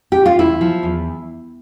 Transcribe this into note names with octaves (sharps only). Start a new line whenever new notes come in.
G4
F4
E2 E4
F3
E2